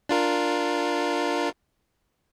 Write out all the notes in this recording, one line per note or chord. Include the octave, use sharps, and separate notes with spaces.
D4 F4 A#4